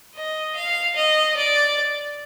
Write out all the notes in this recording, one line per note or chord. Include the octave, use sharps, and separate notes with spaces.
D#5
F5
D#5
D5